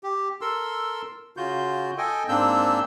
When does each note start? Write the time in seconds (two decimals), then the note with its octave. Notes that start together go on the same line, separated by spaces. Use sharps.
0.03 G4
0.41 A4 A#4 C6 E6
1.37 C#3 F4 F#4 G6
1.98 A4 D#5 G5 G#5
2.29 G#2 A#3 C4 D4 E6 G6